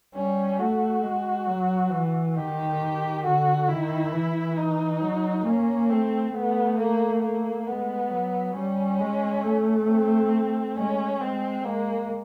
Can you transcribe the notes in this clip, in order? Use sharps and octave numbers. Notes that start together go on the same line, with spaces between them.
G3 C#4
A3 F#4
G#3
F#3
E3
D#3 G4
D3 F#4
D#3 E4
E3
D#4
F#3
A#3 C#4
A3 C4
A3 B3
A#3
A#3
G#3 B3
F#3
G3 C#4
G#3
A3
C4
G#3 C#4
G#3 C4
G#3 A#3